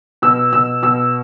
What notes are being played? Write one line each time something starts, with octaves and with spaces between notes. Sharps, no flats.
B2 E6
B2 E6
B2 E6